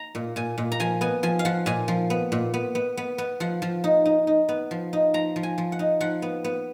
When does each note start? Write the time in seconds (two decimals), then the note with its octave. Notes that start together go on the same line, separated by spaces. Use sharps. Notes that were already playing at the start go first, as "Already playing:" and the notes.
Already playing: A#5
0.15 A#2
0.36 A#2 G#5
0.58 A#2
0.72 A#5
0.80 F3 G#5
1.01 B3 G#5
1.23 F3 G#5
1.39 F5
1.45 F3 F#5
1.66 A#2 G#5
1.88 F3
2.10 B3
2.32 A#2
2.54 B3
2.75 B3
2.97 B3
3.18 B3
3.40 F3 F#5
3.62 F3
3.84 D#4
4.06 D#4
4.27 D#4
4.49 B3
4.71 F3
4.93 D#4
5.14 F3 A#5
5.36 F3
5.43 G#5
5.58 F3
5.72 F#5
5.79 D#4
6.00 F3 F#5
6.22 B3
6.44 B3